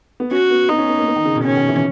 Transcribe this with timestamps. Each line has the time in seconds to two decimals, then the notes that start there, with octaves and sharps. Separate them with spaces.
0.20 B3
0.31 C#4 F#4
0.50 B3
0.69 B3 D#4
0.78 C#4
0.88 B3
0.98 A#3
1.07 B3
1.16 D#3
1.25 C#3
1.35 B2
1.44 D#3 C#4
1.57 D#3
1.69 E3